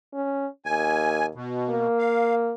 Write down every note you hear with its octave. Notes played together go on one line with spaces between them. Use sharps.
C#4
D#2 G#5
B2
A#3
F5